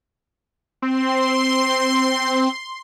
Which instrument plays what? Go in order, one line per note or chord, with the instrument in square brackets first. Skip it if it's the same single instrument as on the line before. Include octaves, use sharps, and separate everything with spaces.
[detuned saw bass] C4 [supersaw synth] C6